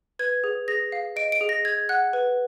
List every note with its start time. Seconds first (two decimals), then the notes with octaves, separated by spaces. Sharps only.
0.19 B4 G#6
0.44 G#4
0.68 G#4 A#6
0.92 F5
1.16 D#5 D7
1.32 D7
1.41 G#4
1.49 A#6
1.65 G#4 G#6
1.89 F#5 F#6
2.13 B4